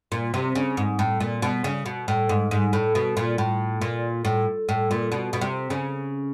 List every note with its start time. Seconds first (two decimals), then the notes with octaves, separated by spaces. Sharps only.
0.12 A#2
0.34 C3
0.55 C#3
0.77 G#2
0.99 A2
1.20 A#2
1.42 B2
1.64 C#3
1.86 B2
2.08 A2
2.29 G#2
2.51 G#2
2.73 A2
2.95 B2
3.17 A#2
3.38 A2
3.82 A#2
4.25 A2
4.69 A2
4.91 A#2
5.12 B2
5.33 B2
5.41 C3
5.70 C#3